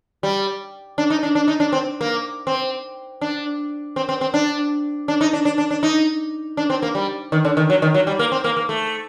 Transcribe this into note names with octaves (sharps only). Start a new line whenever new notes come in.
G3
D4
D#4
D4
D4
D#4
D4
C4
A#3
C4
D4
C4
C4
C4
D4
D4
D#4
D4
D4
D4
D4
D#4
D4
C4
A#3
G3
D#3
D3
D#3
F#3
D#3
F#3
G3
A#3
C4
A#3
A#3
A3